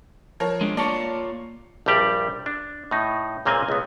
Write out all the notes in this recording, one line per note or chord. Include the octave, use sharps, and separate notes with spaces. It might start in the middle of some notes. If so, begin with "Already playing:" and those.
F3 A#4 C#5
G#3 D4
A#3 F4 C#5 D5 A5
A#1 G2 G3 G4 D5
D4
A2 D#4
C#2 A#2 A#3 C4 F5 G#5
C#2 B3